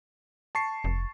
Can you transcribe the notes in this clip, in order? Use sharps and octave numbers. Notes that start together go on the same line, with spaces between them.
A5 C#6 C7
F1